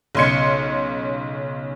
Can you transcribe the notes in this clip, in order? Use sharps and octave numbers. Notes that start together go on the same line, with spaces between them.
B1 C#3 C6 G#6 C#7